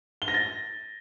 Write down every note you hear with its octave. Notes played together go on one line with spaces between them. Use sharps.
G7
A#6
A6